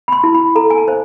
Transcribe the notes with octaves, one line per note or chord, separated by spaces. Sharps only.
B5
C6
E4
B5
A4 A#5
G#5
A5
C5